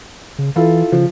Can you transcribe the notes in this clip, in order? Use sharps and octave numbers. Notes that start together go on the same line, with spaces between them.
C#3
E3 E4 F4 A4
C#3 F3